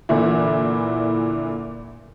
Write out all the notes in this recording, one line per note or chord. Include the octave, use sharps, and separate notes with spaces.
A#2 D3 E3 E4